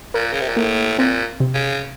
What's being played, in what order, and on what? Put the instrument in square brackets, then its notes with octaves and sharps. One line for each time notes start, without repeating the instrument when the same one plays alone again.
[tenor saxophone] A#2 [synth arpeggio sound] A#4
[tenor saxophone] C#3
C3
A#2
[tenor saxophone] A2 [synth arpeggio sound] A#3
[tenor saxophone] A#2 [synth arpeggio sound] C4
[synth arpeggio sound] C3
[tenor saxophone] C#3